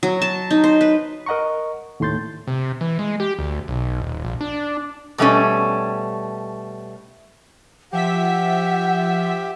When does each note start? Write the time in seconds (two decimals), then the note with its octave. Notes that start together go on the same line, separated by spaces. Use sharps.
0.03 F#3
0.22 A5
0.51 D#4
0.64 C5
0.81 B4
1.26 A#4 D#5 F#5 A#5 C#6
2.00 D#2 A2 A3 C6 G6 A6
2.47 C3
2.81 E3
2.99 G#3
3.20 G4
3.39 D2
3.68 B1
4.01 D#1
4.25 A#1
4.41 D4
5.18 B2 G3 A3 C#4
7.93 F3 G4 E5 F#5 B6